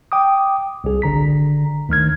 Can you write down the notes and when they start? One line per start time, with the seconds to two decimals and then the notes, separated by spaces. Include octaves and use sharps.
0.12 G5 D6 D#6
0.84 C2 G#4
1.02 G#1 D3 A#5 B6
1.89 D2 D#3 F6 G#6